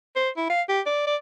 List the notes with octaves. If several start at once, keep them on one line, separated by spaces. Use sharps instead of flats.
C5
E4
F5
G4
D5
D5